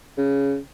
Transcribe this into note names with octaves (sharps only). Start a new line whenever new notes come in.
C#3